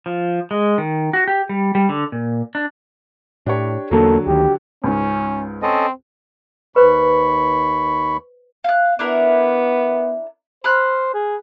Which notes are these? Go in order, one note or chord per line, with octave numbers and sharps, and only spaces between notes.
F3
G#3
D#3
F#4
G4
G3
G3
D3
A#2
D4
A2 D4 G4 C#5
E2 D3 F#3 A#3 A4
D2 D#3 G4
C#2 G#2 C#4
C4 C#4 A4 D#5
D#2 B4 C5 B5 C#6
F5 F#6
B3 D4 E4 A#4
C5 B5 F6 F#6
G#4